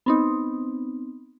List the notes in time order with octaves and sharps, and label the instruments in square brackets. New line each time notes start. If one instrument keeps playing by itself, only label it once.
[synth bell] B3 C4 D#4